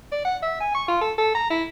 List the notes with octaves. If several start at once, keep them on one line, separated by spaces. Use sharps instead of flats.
D5
F#5
E5
G#5
C#6
F4
A4
A4
A#5
E4